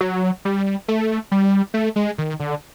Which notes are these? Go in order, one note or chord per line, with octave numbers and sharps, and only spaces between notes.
F#3
G3
A3
G3
A3
G#3
D#3
D3